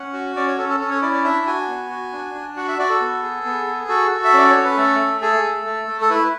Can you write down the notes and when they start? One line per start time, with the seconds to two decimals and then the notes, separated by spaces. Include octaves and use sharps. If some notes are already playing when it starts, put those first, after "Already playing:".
Already playing: C#4 F#5
0.13 F#4
0.36 C#4 D5
0.47 C#5
0.58 C#4 A4
0.69 A4
0.80 C#4 A4
0.91 C#5
1.02 E4 D5
1.13 D5
1.24 D4 E5
1.46 F#4 G#5
1.68 B3
1.90 F#4
2.13 D4
2.35 D4
2.57 F#4 F#5
2.68 E5
2.79 F#4 D5
2.89 A4
3.01 B3
3.23 G#4
3.45 B3
3.67 G#4
3.89 F#4 A4
4.11 F#4
4.24 E5
4.33 C#4 D5
4.51 C#4 C#5
4.64 B4
4.77 A3 A4
4.99 A3
5.22 G#4 A4
5.44 A3
5.66 A3
5.88 A3
6.01 A4
6.10 E4 B4